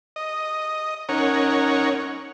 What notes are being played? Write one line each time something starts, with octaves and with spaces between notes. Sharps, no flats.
D#5
C#4 D#4 A#4 C#5 F#5